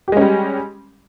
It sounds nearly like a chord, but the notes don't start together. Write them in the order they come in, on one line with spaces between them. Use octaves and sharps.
G4 G#3 C#4 G3